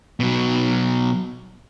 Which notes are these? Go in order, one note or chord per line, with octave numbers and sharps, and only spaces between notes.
B2 F#3